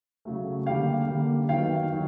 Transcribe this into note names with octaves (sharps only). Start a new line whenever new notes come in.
C#3 F#3 A3
D3 G3 A#3 F5 G5
D3 G3 A#3
D#3 F#3 B3 F5 G5
D#3 F#3